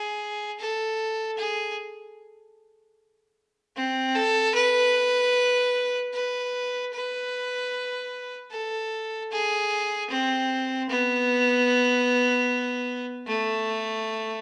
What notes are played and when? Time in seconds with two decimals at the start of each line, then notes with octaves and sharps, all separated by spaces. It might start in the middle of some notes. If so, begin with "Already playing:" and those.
Already playing: G#4
0.59 A4
1.38 G#4
3.76 C4
4.15 A4
4.55 B4
6.13 B4
6.93 B4
8.51 A4
9.32 G#4
10.11 C4
10.89 B3
13.27 A3